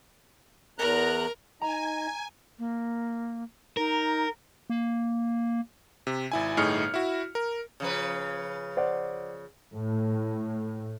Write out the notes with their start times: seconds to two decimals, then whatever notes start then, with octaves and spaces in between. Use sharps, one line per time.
0.79 E2 A#4 A#5 F#6
1.62 D#4 D#5 G#5 A#5
2.59 A#3
3.77 D#4 A#4
4.70 A#3
6.07 C3
6.32 G#1 E4 G#5
6.57 G1 A2 D#4 G#4 F6 C#7
6.94 E4 F#4
7.35 A#4
7.80 C#3 F3 B4
8.77 C5 D5 F#5
9.72 A2